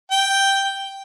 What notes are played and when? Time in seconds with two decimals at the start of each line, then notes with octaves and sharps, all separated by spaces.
0.11 G5